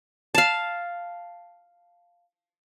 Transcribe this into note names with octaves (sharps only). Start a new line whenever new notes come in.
F5 A5